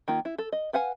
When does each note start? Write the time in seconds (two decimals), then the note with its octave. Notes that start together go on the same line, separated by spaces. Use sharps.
0.08 D#3 A#3 F4
0.25 E4
0.38 A4
0.52 D#5
0.73 B4 F5 F#5 G#5